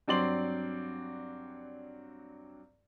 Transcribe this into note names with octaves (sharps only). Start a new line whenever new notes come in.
G2 F#3 C4 D5 C6 F#7